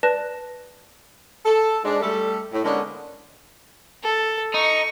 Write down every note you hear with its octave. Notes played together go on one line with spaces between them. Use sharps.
B4 D5 A5 F#6 A#6 E7
A4
G#2 G#3 D4
G3 A3 A4
A2
D3 G#3 A#3 B3 C#4 D4
A4
D#4 C#6